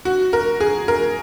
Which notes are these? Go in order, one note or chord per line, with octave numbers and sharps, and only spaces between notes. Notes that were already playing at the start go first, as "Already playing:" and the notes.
F#4
A#4
G#4
A#4